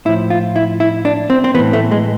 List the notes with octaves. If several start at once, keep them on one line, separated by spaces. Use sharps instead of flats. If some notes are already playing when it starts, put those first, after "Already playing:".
A2 F3 E4
F4
E4
E4
D4
C4
C4
A2 E3 B3
A3
G#3